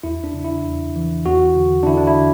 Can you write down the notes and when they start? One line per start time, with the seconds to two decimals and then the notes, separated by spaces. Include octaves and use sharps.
0.04 E2 E4
0.24 D4
0.34 C#3
0.44 E4
0.65 E2
0.96 E3
1.26 E2 F#4
1.57 D3
1.83 D4
1.87 D3 E4
1.97 D4
2.07 E4